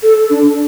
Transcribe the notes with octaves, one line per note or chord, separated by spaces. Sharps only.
A4
D4